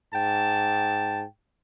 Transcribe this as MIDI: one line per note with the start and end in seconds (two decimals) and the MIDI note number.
0.13 1.23 44
0.13 1.23 79
0.13 1.23 81